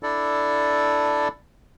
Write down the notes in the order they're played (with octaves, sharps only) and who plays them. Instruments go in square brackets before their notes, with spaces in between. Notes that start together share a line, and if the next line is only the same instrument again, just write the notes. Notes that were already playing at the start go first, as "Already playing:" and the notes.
[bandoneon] D4 E4 A4 D5